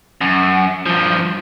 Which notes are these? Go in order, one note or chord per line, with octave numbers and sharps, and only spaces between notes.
F#2
G2 F3